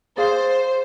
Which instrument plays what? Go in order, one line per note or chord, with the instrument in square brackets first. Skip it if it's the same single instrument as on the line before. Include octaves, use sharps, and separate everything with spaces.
[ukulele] G#4 D5 F5 [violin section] C5